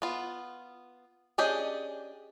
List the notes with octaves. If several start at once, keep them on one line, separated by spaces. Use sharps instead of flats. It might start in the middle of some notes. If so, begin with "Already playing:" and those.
B3 F4
C#4 D4 G4 G#4 D#5